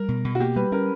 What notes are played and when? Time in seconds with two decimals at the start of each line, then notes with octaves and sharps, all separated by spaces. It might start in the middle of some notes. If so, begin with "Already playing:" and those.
Already playing: G3 A#4
0.08 B2
0.24 B2
0.35 F#4
0.40 A#3 G4
0.56 G3 B4
0.72 C#4 A#4